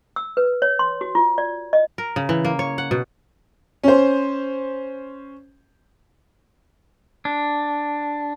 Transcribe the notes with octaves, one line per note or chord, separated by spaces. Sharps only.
E6
B4
C#5
C6
F#4
F4
D5
D#5
A#4
C#3
E3
A#3
C#5
F#5
B2
C#4 C5
D4